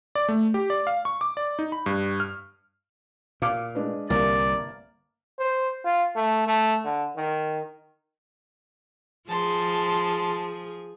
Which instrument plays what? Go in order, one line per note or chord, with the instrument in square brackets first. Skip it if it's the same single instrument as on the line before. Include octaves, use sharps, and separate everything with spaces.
[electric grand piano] D5
A3
G4
D5
F5
C#6
D6
D5
D#4
B5
G2
F6
[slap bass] A#2 [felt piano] F5 D6 F6
[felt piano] G#3 D4 B4
[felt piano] G1 A#3 [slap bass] C2 [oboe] D5
[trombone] C5
F4
A3
A3
D3
D#3
[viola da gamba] F3 G#4 [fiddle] A5 C6